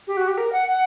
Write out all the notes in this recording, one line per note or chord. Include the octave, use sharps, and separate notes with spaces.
G4
F#4
G4
A#4
F#5
F#5